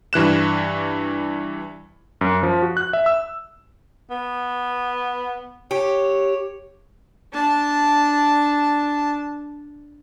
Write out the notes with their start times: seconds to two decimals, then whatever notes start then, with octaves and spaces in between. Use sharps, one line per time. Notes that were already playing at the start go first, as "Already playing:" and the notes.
0.13 G2 E3 F#6 E7
2.21 F#2
2.43 F3
2.62 F#4
2.77 F#6
2.93 E5
3.06 E6
4.10 B3
5.71 G4 C#5
7.33 D4 A5